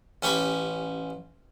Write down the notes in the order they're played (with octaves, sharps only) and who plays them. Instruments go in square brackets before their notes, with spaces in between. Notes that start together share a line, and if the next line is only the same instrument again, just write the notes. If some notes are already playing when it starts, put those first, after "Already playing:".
[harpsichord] A1 C#4 G4 C#5 B5